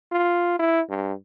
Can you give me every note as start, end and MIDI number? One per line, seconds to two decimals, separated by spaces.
0.12 0.55 65
0.59 0.81 64
0.89 1.13 43